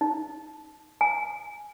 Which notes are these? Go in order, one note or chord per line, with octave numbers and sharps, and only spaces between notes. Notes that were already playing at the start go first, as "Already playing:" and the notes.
D#4
G#5